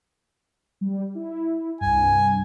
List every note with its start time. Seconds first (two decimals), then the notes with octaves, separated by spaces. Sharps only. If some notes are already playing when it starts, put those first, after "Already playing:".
0.81 G3
1.15 E4
1.81 C2 G2 G#5